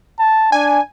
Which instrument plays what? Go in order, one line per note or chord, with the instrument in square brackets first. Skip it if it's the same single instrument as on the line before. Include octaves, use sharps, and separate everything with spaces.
[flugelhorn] A5
[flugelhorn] D4 [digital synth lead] G#5